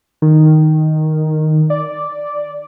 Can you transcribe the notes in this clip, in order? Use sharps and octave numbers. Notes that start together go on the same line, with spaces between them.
D#3
D5